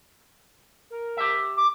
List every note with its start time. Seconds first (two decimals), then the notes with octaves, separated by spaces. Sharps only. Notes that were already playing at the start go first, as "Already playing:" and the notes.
0.91 A#4
1.17 G4 E5
1.57 D6